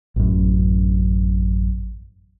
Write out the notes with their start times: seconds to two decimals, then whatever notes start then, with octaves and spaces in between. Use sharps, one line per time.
0.16 A1 F#2